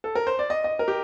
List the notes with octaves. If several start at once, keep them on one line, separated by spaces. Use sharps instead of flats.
A4
A#4
C5
D5
D#5
D#5
A#4
G4